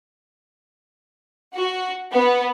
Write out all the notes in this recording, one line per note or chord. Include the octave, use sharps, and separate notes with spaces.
F#4
B3